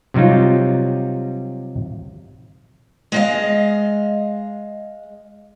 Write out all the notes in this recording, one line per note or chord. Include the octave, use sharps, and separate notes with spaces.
C3 F#3 G3 D#4 F4
G#3 D#5 F5